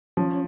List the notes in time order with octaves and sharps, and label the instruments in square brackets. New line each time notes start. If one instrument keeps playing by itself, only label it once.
[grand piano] F3 [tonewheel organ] C#4